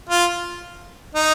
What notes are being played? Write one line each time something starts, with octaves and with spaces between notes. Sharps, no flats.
F4
D#4